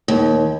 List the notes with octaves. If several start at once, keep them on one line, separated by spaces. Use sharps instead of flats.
D#2